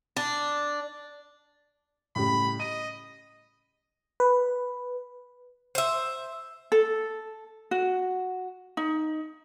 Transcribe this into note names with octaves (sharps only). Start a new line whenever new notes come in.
D4
A2 C#3 G3 B5
D#5 D#7
B4
C5 E5
A4
F#4
D#4